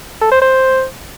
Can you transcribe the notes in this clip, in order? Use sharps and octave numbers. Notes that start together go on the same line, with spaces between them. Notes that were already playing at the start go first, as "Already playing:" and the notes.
A4
C5
C5